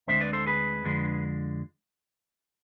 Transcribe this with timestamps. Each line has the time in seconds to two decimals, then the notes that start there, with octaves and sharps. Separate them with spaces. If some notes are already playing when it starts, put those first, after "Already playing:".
0.08 D2 D3 G#3 C4 C5 E5
0.21 B4 D5
0.33 A4 C5
0.46 G#4 B4
0.84 F2 D3 G#3 D4